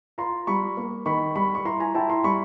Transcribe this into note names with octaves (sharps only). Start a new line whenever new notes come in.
F4 A#5 C6
G3 B5 C#6
A#3
D#3 B5 C#6
G3 B5 C#6
C#6
E4 A#5 C6
G#5 A#5
E4 G5 A5
A#5 C6
G3 B5 C#6